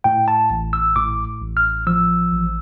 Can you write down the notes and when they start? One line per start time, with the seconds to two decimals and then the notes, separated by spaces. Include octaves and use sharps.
0.04 A2 G5
0.28 A5
0.50 A1
0.73 E6
0.96 A2 D6
1.41 A1
1.57 F6
1.87 F3 E6
2.32 A1